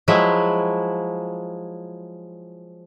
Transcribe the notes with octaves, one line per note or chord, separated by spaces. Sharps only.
F3 F#3 G#3 E4